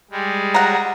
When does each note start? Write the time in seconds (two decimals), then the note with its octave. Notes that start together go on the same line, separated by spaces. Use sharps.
0.11 G3 G#3
0.54 F#5 A#5